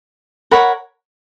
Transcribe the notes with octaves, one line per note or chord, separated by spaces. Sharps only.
A#4 C#5 F#5 B5